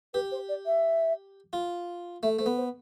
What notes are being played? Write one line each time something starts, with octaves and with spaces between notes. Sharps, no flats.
G4 B4
C5
D5
E5
F4
A3 E5
A3 C5
B3
C5